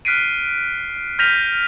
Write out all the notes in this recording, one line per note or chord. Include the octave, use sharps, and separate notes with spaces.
F6 F#6 B6 C7 D7 D#7
F6 G6 A#6 B6 D#7 F7